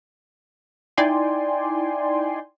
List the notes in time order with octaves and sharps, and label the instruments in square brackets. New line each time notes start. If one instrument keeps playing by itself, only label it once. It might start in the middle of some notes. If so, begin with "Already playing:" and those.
[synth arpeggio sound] D#4 E4 D5 G5 G#5 C6